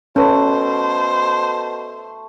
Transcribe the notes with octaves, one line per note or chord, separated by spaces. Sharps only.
B2 A3 C#4 B4 C5